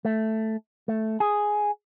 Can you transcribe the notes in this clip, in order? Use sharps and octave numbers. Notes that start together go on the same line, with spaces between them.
A3
A3
G#4